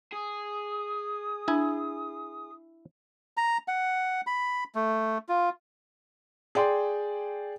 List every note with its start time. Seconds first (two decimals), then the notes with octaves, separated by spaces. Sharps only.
0.13 G#4 D#6
1.48 D4 E4 G#5
3.37 A#5
3.68 F#5
4.27 B5
4.75 A3
5.29 F4
6.55 G#4 D5 G5 C6